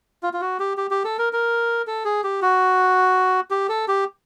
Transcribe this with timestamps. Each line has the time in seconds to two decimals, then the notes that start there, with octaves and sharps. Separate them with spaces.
0.23 F4
0.33 F4
0.41 F#4
0.59 G4
0.77 G4
0.91 G4
1.05 A4
1.19 A#4
1.33 A#4
1.87 A4
2.05 G#4
2.24 G4
2.42 F#4
3.51 G4
3.69 A4
3.88 G4